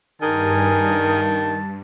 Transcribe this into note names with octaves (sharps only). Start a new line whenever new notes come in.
G2 D#3 G#4 A#4 G#5 A5